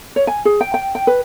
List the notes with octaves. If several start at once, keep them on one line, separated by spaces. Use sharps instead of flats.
C#5
G#5
G#4
G5
G5
G5
B4